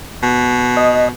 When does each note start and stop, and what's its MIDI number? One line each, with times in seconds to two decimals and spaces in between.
0.23 1.10 47
0.77 1.08 75